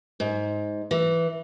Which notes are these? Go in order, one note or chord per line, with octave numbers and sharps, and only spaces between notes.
G#2
E3